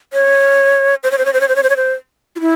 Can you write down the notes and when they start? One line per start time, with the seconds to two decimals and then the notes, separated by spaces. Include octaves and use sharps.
0.13 C#5
1.04 C5
1.11 C#5
1.18 C5
1.25 C#5
1.33 C5
1.41 C#5
1.48 C5
1.56 C#5
1.63 C5
1.70 C#5
1.77 C5
2.36 F4
2.41 E4